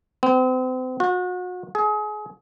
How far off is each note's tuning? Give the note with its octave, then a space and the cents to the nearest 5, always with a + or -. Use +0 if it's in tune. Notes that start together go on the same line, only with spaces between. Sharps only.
C4 -40
F#4 -35
G#4 +30